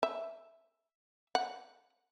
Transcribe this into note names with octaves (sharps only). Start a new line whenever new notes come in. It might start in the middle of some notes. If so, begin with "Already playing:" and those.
E5
F#5